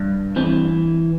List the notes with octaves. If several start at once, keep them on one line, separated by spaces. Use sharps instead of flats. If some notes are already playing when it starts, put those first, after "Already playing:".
Already playing: G2
E3 C4